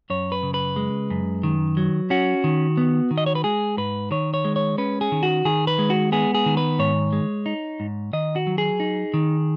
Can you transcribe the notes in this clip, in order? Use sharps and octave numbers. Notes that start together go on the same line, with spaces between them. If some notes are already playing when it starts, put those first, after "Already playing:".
F#2 C#5
B4
C#3
B4
G#3
F#2
D#3
F#3
C#4 F#4
D#3
B3
D#3
D#5
C#5
B4
G#3 G#4
G#2 B4
D#3 C#5
C#5
G#3
C#5
C#4 B4
G#4
D#3
F#4
D#3 G#4
B4
G#3
F#4
B3 G#4
G#4
D#3
B4
G#2 C#5
G#3
D#4
G#2
D#3 D#5
F#4
F#3
G#4
D#4
D#3